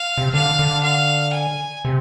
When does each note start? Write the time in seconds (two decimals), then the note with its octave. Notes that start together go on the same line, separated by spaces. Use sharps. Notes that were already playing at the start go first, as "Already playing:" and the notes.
Already playing: F5
0.18 C3
0.34 D3 F5
0.59 D3
0.83 F5
1.34 G#5
1.85 C3